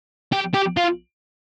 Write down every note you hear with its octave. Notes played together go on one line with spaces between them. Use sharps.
G4
G4
F4